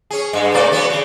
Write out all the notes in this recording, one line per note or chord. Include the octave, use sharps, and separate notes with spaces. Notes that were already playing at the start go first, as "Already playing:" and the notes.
C#4 G#4
G2 G#3
C3 A3 D5
F#3 B3 C#4
C#3